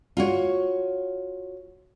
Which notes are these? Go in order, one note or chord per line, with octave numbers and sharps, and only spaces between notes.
F4 F#4 C#5